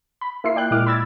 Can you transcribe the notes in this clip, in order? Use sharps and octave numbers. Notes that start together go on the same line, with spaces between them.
B5
A#3 E4 F4 C7
D5 G5 F#6
A#2 G#3 E4 D6 F6
B5 E6 G#6 A6